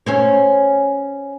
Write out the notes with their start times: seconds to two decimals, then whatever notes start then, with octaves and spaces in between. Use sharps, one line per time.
0.06 C#4 C5 C#5